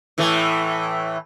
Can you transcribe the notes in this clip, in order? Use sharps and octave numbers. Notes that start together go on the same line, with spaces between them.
A2 E3 A3